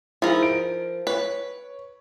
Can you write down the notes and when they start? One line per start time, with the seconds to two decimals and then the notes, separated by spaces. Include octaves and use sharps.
0.22 F3 D#4 E4 G#4 A#4
0.43 D7
1.07 B4 C#5